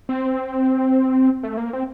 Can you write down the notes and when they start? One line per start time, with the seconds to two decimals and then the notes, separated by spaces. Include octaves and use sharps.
0.09 C4
1.43 A3
1.57 A#3
1.73 C4